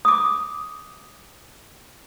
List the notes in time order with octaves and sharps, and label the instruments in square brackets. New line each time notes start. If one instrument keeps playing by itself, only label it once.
[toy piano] D6 D#6